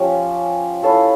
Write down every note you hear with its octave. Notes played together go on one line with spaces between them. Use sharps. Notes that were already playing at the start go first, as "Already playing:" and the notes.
Already playing: F3 C#4 G4
E4 A4 C#5 F5